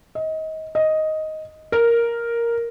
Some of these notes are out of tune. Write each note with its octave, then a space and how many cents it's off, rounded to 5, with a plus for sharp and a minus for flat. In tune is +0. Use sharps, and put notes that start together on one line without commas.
D#5 +25
D#5 +5
A#4 +0